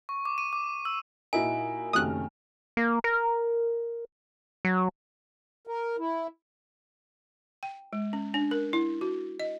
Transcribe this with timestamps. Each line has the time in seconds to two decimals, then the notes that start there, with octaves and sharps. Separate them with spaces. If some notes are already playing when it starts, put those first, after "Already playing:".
0.09 C#6
0.25 D6
0.38 D#7
0.53 D6
0.85 E6
1.33 A#2 D#4 E4 F#4 A#4 G#5
1.93 F#1 C3 D#3 A3 F#4 D#6 F6 F#6
2.77 A#3
3.04 A#4
4.65 F#3
5.67 A#4
5.98 E4
7.63 G5
7.93 G#3
8.13 C#4
8.34 D4
8.51 A#4
8.73 E4
9.01 F#4
9.40 D#5